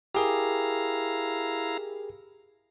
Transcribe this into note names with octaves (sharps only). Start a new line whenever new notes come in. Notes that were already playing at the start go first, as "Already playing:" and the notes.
E4 G4 G#4 A#4 F5 A#5